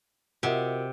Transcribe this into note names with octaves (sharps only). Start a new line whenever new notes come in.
C3 F4 F#4 A#4 D#5 E5 F#5